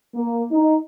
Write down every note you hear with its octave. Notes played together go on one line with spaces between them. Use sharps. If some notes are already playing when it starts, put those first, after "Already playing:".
A#3
D#4